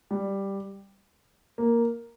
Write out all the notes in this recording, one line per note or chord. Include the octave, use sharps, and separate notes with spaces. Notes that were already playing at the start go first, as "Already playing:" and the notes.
G3
A#3